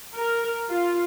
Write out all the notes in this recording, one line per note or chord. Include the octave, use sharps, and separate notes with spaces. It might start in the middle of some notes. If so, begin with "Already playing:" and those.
A#4
F4